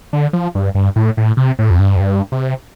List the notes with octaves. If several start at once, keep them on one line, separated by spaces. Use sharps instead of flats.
D3
F3
G2
G2
A2
A2
C3
A2
F2
G2
F2
G2
C3